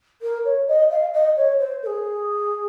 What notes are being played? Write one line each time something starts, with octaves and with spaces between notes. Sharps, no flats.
A#4
C#5
D#5
F5
D#5
C#5
C5
A#4
G#4